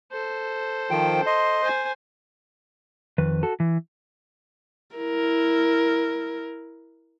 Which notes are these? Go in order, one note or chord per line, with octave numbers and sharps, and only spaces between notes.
A4 C5
D#3 F3 G5
D#5 C6
C5 G#5
F2 D#3 B4
F#4 A4
E3
E4 A#4